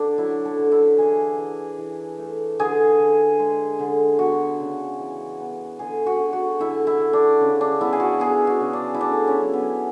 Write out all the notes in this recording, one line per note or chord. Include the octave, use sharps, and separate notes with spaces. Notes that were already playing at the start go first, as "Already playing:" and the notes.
Already playing: D3 D4
F#3 E4
A4
D3
E4
E3 G#4
E3
E3
A3
D3 G#4
D3
G#3
D3
B3 F#4
C#3
E3
B3
D3 G#4
F#4
D3
F#4
D3 E4
E4
D3
D4
C#3
D4
B3 E4
G#4
F#4
B3 G#4
F#4
C#3
D4
E4
A3 D4
C#4
F#3
B3